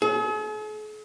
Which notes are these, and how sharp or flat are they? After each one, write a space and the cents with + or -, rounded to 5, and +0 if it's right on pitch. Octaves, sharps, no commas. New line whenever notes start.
G#4 +45